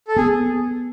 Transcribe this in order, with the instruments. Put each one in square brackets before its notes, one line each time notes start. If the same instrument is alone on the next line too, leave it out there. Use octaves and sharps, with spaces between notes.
[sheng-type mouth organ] A4
[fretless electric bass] B3 [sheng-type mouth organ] G#4